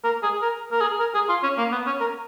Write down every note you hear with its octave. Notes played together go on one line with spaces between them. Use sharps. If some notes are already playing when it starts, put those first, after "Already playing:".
A#4
G#4
A#4
A#4
G#4
A#4
G#4
F4
C#4
A#3
B3
C#4
A#4